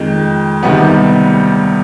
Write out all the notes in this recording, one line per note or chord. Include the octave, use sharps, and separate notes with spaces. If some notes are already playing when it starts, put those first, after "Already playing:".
Already playing: F2 D#3 G#3
D2 C3 D#3 G3 B3